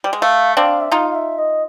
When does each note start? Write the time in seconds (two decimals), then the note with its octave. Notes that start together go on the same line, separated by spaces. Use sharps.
0.04 G3
0.13 G#3
0.21 A3 F5
0.57 C4 D4 F5
0.81 E5
0.92 D#4 F4 F5
1.10 F5
1.15 E5
1.38 D#5